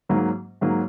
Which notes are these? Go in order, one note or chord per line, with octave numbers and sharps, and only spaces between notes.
G#2 F#3 A#3
G#2 F#3 A#3